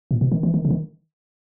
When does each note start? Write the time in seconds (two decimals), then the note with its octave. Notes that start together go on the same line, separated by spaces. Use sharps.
0.11 A#2
0.21 B2
0.32 D#3
0.43 E3
0.54 D#3
0.65 C#3
0.70 D#3